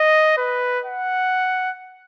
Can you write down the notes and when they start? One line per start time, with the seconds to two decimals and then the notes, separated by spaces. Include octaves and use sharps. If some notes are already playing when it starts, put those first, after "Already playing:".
Already playing: D#5
0.38 B4
0.86 F#5